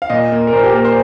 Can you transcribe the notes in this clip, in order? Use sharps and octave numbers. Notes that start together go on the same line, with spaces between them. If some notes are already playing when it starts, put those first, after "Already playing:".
F5
A#2 D#5
A#3
A#4
A#2 C5
G4
A#3 A#4
C5